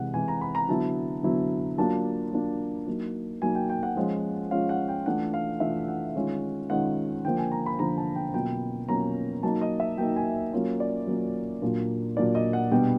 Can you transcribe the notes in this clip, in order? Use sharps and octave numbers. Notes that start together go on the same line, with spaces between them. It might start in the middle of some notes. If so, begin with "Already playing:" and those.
Already playing: C3 E3 G#3 F#5
C3 E3 G#3 G#5
A#5
B5
A#5
D3 F#3 B3 E4 A5
D3 F#3 B3 E4
F#3 A#3 D4 F4 A5
F#3 A#3 D4 F4
F#3 A#3 D#4
F#3 A#3 D#4 G#5
G5
G5
F#5
F3 G#3 C#4 F4
F3 G#3 C#4 F4 F5
F#5
G5
E3 A3 D4 F4 F#5
F5
E3 A3 D4 F4 E5
F#5
D#3 G#3 C#4 F4
D#3 G#3 C#4 F4 F#5
D3 F3 A#3 G5
G#5
A#5
B5
D3 F3 A#3 A#5
A5
G5
B2 F#3 A#3 C#4 F4 G5
B2 F#3 A#3 C#4 F4 A#5
F#3 A#3 D#4 A5
D#5
E5
F#3 A#3 D#4 G5
G#5
F#3 A#3 C#4 F4
D5
F#3 A#3 C#4 F4
A#2 F#3 A#3 D4 F4
A#2 F#3 A#3 D4 F4 D5
D#5
F#5
B2 G3 B3 D4 G5